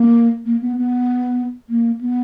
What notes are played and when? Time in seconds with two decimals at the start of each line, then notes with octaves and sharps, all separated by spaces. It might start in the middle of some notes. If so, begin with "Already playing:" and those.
Already playing: A#3
0.46 A#3
0.61 B3
0.77 B3
1.70 A#3
2.01 B3